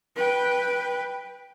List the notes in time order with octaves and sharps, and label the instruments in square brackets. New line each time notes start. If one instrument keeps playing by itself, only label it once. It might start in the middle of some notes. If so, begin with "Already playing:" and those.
[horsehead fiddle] B4 G5